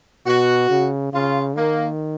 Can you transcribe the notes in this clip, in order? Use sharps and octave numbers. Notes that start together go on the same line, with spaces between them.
B2 F#4
C#3
C#3 F4
D#3 A#3